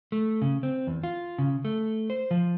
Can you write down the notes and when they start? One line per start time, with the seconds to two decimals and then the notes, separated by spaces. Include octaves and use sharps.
0.12 A3
0.42 C#3
0.63 C4
0.87 E2
1.04 F4
1.38 C#3
1.65 A3
2.10 C5
2.31 F3